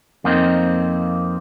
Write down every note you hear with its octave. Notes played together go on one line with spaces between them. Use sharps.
F2 A#3 C4 D#4